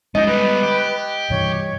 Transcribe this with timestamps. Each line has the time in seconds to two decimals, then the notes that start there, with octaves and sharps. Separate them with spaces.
0.15 F#3 G#3 C#4 D#4 D#5
0.27 G3 B3 B4
0.63 G4
1.30 G2 C3 E3 C#5